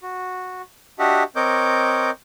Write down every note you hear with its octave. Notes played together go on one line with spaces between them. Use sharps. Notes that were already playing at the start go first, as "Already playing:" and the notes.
F#4
D4 F#4 G4 D#5 E5 F#5
C4 A#4 C#5 D#5 D6 G6